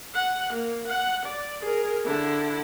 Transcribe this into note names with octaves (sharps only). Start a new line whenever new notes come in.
F#5
A#3
F#5
D5
G#4 A#4
D3 E4